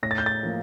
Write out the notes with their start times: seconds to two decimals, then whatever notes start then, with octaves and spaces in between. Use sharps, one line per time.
0.03 A2 A#6
0.11 A6
0.18 G6
0.26 A6
0.43 F3 A#3